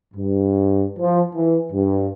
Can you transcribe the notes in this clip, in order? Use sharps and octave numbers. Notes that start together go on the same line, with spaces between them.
G2
F3
E3
G2